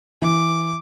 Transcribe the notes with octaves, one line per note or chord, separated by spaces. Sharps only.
E3 D6